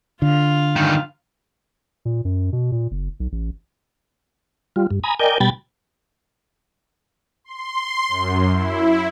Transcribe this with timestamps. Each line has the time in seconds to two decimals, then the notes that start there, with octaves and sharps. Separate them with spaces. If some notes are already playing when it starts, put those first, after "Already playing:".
0.22 D3 F4 F5
0.76 G2 D#3
2.05 A#2
2.25 F#2
2.53 B2
2.72 A#2
2.91 F#1
3.20 B1
3.32 A1
4.76 G3 F4
4.91 G2
5.04 G#5 A#5 B5 D#6
5.19 A#4 D5 D#5 G5 G#5 G6
5.40 B2 G3 G5 B5 G#6 A6
7.44 C6
8.08 F#2
8.51 E4